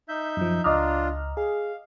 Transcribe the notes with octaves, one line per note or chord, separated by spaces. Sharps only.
D#4 E5 G6
F#2 F3
C#2 D4 F4 D#5 A#5 D6 D#6 F6
G#4 F5